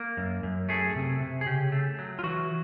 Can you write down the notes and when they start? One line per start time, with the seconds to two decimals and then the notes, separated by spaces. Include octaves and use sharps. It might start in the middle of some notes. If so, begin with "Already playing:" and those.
Already playing: A#3
0.17 F#2
0.43 F#2
0.69 A3 G#4
0.96 C3
1.20 C3
1.41 G#4
1.47 C#3 G4
1.72 A3
1.99 F#3
2.19 F4
2.23 E3 F#4